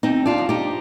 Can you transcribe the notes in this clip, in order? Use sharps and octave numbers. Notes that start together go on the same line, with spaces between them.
D#2 C4 D#4
D4 F4
F3
D#4 G4